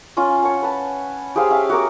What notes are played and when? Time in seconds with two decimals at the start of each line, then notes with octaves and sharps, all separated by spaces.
0.17 C#4 F4
0.42 C#5 F#5 A5
0.62 B4 A5
1.36 G4 G#4 C5 F5
1.50 C#4 E5 F5
1.69 F#4 A#4 D6